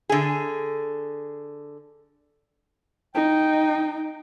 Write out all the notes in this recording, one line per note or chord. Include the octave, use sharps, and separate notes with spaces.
D3 G#4
D#4 G5